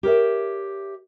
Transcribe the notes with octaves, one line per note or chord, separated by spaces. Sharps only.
G4 A#4 C#5 E5